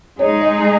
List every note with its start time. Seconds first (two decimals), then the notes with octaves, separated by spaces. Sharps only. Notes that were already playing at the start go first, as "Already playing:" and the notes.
0.19 G#3 D#4 G#4 C#5
0.42 D#5